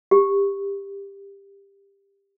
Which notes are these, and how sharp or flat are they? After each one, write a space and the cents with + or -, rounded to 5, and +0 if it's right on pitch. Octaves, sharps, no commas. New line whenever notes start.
G4 +20